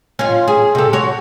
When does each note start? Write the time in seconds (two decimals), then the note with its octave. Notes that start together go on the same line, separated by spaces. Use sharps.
0.19 C#4 F4
0.48 G#4
0.75 C3 A4
0.93 F#4 C#5